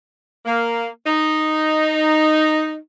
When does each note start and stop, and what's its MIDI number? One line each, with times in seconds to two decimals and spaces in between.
0.45 0.88 58
1.06 2.76 63